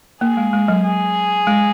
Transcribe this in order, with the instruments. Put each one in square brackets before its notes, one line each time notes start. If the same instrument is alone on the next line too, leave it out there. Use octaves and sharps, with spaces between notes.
[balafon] A#3 [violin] G#4
[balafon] G#3
G#3
F#3
[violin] G#4
[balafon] G#3